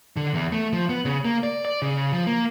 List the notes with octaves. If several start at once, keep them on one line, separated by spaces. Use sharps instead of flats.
D3
E2
A3
F3
B3
C#3
A#3
D5
D5
C#3
F3
A#3